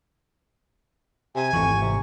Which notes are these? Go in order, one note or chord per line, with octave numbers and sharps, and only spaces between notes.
C3 G#5
G#1 F2 E3 C#6
C3